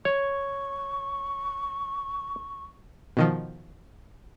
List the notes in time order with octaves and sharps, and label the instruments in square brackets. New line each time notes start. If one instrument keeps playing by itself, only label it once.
[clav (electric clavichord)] C#5 [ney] C#6
[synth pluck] B2 D#3 F3